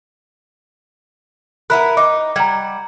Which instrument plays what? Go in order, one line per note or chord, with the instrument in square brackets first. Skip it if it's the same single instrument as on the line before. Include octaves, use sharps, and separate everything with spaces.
[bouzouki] B3 E4 A#4 [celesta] B5 F#6
[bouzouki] D#4 [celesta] D6
[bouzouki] G3 F#5 [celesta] A#5 G#6